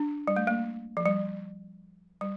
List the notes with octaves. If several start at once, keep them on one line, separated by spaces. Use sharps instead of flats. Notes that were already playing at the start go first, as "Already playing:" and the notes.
Already playing: D4
G3
A3
A#3
F3
G3
G3